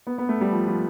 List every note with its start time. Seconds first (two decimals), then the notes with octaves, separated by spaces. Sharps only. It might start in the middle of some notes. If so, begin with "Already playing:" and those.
0.07 B3
0.18 B3
0.29 A3
0.41 G3
0.53 F3
0.68 F3